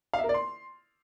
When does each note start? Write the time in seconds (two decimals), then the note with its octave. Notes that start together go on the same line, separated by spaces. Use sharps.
0.14 F5
0.19 E5
0.24 A#4
0.29 D5
0.34 C6